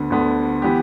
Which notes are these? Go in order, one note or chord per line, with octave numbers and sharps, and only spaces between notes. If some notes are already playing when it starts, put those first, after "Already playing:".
Already playing: D2 D3 B3
D2 D3 B3
E3 B3 G4